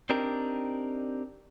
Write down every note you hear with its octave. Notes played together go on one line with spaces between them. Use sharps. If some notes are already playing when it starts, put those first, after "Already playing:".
C4 D4 D#4 G4 A#4